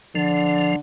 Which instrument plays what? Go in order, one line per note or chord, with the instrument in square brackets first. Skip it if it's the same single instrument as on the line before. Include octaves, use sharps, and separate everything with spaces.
[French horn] D3 [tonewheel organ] F3